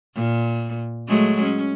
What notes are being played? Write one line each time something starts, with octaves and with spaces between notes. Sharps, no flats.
A#2
F#3 G#3 A3
C#4